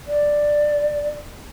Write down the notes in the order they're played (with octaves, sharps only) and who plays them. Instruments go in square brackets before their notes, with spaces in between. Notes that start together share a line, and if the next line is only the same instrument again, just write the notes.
[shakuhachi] D5